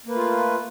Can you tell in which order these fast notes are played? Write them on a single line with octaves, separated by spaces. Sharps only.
A#3 B4 A3 F4